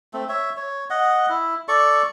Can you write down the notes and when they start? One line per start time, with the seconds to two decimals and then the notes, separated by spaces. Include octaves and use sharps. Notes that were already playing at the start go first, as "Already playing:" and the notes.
0.13 A3 C4
0.29 C#5 E5
0.57 C#5
0.90 D#5 F#5
1.29 E4
1.68 A4 D5 C#6